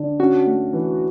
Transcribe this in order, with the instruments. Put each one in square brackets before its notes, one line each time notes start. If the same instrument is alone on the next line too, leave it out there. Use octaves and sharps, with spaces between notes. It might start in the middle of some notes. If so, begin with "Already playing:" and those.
Already playing: [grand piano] D3
[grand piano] C#4 [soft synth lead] F#4
[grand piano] A3
E3